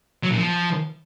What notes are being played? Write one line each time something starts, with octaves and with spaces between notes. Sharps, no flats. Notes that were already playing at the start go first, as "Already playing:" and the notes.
F#3
A#2
F3